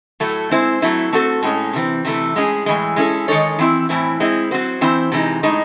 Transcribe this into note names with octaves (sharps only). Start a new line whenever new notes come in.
A2 F#3 A3
G#3 C4 E4 C5
F#3 A3 C4 E4
A3 C4 F#4 A4
A2 G#3 C#4
C3 E3 C4
C3 E3 A3
A2 G#3 C#4 G#4
A2 E3 G#3
G#3 C#4 E4 A4
D#3 G#3 D#4 A4 C#5
E3 C4 E4
A2 E3 C4 E4
G#3 C4 E4
F#3 C4 F#4 C5
E3 C4 E4 C5
C3 E3 G#3 D#4
A2 G#3 D#4